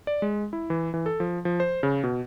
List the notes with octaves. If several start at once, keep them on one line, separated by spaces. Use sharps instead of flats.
D5
G#3
E4
E3
E3
A4
F3
F3
C5
C#3
B2